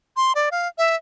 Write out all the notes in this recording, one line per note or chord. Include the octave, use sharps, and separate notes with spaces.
C6
D5
F5
E5